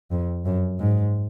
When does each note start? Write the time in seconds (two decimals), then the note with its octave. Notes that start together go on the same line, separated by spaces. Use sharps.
0.11 F2
0.45 F#2
0.79 G#2